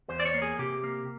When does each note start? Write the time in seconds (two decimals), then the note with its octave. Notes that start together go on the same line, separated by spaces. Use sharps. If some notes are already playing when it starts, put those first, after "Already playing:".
0.09 E2 C5
0.20 D5
0.25 C#5
0.34 A#3
0.42 G#4
0.59 C3 G4
0.84 A#3